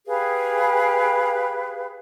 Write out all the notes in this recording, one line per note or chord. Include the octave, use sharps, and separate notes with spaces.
G4 G#4 B4 F5